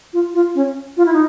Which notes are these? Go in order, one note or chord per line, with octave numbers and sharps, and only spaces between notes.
F4
F4
C#4
F4
E4
D#4